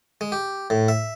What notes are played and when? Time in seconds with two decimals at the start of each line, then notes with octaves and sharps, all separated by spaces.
0.21 G#3
0.32 G4
0.70 A2
0.88 E5